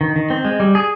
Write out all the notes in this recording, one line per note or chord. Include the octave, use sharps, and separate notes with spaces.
D#3
D#3
C4
G#3
G3
G#4